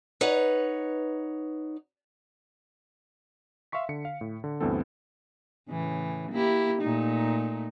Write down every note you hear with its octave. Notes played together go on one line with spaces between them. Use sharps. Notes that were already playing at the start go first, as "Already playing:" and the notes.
D#4 B4 C#5 F#5
E5 F5 C6 C#6 B6
D3 C#7
F5
A2
D3
D2 G2 E3 B3 C4 A4
A2 C#3 E3
A#3 E4 G4
A#2 A3 D#4